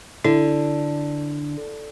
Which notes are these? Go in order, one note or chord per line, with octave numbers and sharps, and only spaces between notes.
D3 E4